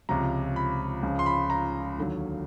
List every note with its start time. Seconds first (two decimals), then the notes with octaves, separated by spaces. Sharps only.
0.09 C#2 C3 F3 A#5
0.56 B5
1.03 C#2 C#3 F3
1.19 C6
1.26 B5
1.50 A#5
1.98 D#2 D3 F#3